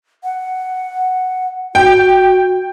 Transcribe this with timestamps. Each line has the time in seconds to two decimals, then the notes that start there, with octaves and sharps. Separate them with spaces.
0.24 F#5
1.75 F#4 G5